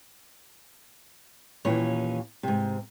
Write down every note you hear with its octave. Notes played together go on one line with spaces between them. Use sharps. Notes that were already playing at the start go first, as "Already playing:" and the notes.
D#2 A#2 E3 C#4 C#5
G#2 C3